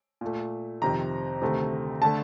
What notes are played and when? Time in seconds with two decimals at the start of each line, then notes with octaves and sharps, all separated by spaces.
0.21 A#2 A3
0.82 F2 C3 D#3 A#5
1.42 D2 C3 D#3 A3
2.02 D3 A3 A5